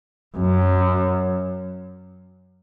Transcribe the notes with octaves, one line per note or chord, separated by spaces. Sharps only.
F#2